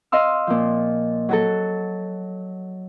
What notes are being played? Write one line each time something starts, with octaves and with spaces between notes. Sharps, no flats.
D#5 F5 C6 E6
A#2 F3
F#3 F#4 A4